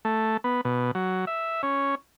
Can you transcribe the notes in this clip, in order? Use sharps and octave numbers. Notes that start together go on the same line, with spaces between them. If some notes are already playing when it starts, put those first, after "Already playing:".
A3
B3
B2
F#3
E5
C#4